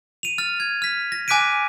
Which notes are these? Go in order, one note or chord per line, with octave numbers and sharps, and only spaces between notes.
D#7 F7
F6 A6
G#6
F6 B6
A#6
G#5 D6 F#6 B6 D7 D#7